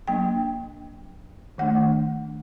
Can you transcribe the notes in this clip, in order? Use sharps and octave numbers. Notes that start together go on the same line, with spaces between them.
F#3 A#3 D4 G5
D#3 A3 D4 F#5